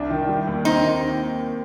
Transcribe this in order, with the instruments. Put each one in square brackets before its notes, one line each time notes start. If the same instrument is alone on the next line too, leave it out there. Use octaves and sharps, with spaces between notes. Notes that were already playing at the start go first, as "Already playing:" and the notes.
Already playing: [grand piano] C2 D4
D#3
G3
D#2
[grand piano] C4 [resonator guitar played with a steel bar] D#4
[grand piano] D#3